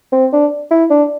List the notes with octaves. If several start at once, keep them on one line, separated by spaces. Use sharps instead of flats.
C4
D4
E4
D4